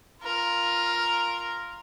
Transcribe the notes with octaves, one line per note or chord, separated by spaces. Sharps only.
F4 A#4